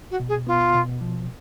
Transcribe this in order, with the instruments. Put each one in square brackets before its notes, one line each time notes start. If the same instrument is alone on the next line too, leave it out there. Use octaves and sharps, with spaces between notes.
[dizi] F#4
[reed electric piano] B2
[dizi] G#4
[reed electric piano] B3 [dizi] F4
[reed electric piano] B2
F3